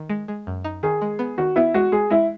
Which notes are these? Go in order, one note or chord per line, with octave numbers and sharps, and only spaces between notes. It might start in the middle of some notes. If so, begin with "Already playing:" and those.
Already playing: D#3
G#3
G#3
F#2
D#4
D#3 G#4
G#3
B3
D#3 F#4
B3 E4
G#3 F#4
G#3 G#4
G#3 E4